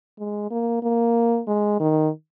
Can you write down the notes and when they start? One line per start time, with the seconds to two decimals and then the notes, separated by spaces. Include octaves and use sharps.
0.19 G#3
0.51 A#3
0.83 A#3
1.47 G#3
1.80 D#3